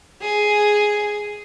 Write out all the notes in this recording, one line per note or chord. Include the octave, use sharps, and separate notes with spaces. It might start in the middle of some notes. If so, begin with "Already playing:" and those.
G#4